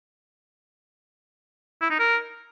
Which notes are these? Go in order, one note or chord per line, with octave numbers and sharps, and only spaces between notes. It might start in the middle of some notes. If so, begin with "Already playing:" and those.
E4
D#4
A#4